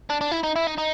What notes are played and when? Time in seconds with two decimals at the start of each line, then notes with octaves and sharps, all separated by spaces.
0.10 D4
0.21 D4
0.32 E4
0.44 D#4
0.56 E4
0.67 D#4
0.78 D#4